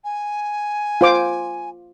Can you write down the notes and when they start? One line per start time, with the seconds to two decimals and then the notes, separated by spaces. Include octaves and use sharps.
0.04 G#5
1.01 F4 C5 D6